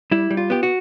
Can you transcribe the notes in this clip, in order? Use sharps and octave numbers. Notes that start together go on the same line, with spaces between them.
G3 E4
G3
F4
B3 G4
F#4